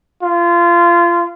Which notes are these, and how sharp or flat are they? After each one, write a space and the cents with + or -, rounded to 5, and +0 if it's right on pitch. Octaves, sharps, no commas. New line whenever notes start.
F4 -25